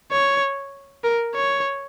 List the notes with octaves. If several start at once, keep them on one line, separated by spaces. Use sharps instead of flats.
C#5
A#4
C#5